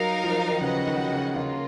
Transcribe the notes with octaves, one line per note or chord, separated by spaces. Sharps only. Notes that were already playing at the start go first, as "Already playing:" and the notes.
Already playing: F#3 D#4 A#4 F5
F3
D#3
C#3 F#4 B4 D#5 F#5
C#3
D#3
C#3
C#3 A#3 F4